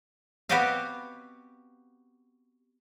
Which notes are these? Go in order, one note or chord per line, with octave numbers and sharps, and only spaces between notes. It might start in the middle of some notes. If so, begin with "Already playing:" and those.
B3 C4 F#4 G4 D#5 F5